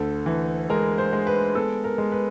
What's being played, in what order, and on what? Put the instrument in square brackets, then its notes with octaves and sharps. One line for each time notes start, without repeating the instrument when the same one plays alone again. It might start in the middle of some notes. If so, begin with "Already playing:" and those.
Already playing: [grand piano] D2 A4
E3
G#3 A#4
C5
G#3
B4
B3 A4
A#4
G#3
B4